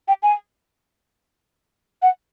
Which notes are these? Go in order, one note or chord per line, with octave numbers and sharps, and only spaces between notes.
G5
G#5
F#5